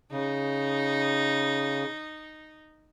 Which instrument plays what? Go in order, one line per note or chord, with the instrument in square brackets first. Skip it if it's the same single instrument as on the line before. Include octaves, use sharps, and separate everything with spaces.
[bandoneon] C#3 [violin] D#4